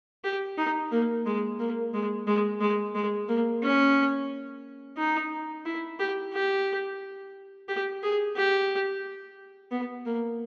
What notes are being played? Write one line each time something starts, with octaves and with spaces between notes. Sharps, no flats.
G4
D#4
A#3
G#3
A#3
G#3
G#3
G#3
G#3
A#3
C#4
D#4
E4
G4
G4
G4
G#4
G4
B3
A#3